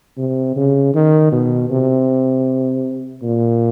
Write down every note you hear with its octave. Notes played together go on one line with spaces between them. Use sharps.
C3
C#3
D#3
B2
C3
A#2